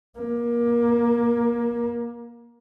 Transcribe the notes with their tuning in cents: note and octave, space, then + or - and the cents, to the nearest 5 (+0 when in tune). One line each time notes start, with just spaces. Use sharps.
A#3 +25